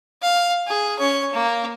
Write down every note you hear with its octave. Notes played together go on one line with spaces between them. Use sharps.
F5
G#4
C#4 C#5
A#3